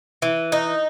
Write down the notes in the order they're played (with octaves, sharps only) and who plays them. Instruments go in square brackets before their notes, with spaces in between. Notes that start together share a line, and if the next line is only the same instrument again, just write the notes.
[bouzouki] E3
D#4